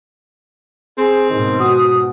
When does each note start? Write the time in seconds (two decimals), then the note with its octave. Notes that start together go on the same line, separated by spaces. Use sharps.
0.98 C4 G#4
1.30 G#2 B2 D#3
1.60 F#4 D#6